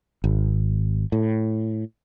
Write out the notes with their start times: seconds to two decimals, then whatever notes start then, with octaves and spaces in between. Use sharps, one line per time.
0.24 G#1
1.12 A2